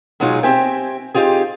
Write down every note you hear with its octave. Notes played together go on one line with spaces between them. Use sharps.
B2 F#3 G#3 D#4 F4 G#4
C4 G4 E5 G5 G#5
C4 D#4 F4 G4 G#4